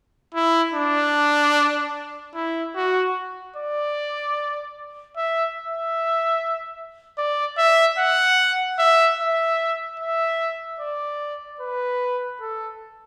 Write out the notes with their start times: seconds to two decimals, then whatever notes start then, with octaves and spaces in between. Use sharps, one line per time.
0.34 E4
0.74 D4
2.35 E4
2.75 F#4
3.56 D5
5.16 E5
5.57 E5
7.18 D5
7.58 E5
7.98 F#5
8.78 E5
9.19 E5
10.00 E5
10.80 D5
11.61 B4
12.41 A4